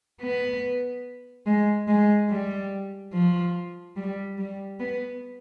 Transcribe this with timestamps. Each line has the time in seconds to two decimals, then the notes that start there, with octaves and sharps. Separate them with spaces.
0.21 B3
1.46 G#3
1.88 G#3
2.29 G3
3.13 F3
3.96 G3
4.38 G3
4.80 B3